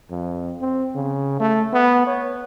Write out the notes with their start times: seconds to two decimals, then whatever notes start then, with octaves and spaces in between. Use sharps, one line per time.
0.10 F2
0.61 C4
0.95 C#3
1.40 A3
1.73 B3
2.07 C#5